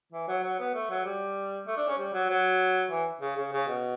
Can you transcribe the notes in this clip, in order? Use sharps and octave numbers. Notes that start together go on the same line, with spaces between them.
E3
F#3
F#3
B3
A3
F#3
G3
A3
D4
C#4
G3
F#3
F#3
E3
C#3
C#3
C#3
B2